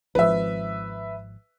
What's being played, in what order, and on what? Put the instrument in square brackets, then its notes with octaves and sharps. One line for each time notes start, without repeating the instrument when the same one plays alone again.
[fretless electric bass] G#1 F3 [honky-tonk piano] B4 E5